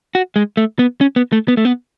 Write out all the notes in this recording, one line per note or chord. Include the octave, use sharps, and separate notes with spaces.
F#4
G#3
A3
B3
C#4
B3
A3
B3
A3
B3